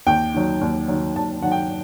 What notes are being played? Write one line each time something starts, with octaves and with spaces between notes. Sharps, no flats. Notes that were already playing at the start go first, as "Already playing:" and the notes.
D#2 G5
D#3 F#3
D#2
D#3 F#3
D#2 A5
D#3 F#3 F#5
G5